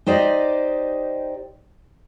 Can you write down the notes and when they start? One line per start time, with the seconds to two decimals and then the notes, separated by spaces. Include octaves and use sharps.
0.06 D#4 G4 C5 D5 D#5